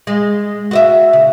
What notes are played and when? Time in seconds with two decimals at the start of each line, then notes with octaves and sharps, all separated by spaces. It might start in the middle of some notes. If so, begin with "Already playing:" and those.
0.07 G#3
0.71 F#4 D#5 E5
1.13 C#3